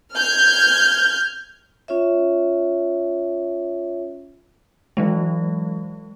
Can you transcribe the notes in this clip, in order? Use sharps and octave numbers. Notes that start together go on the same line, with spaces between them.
F6 G6 G#6
C#4 F4 C#5 E5
E3 F#3 G#3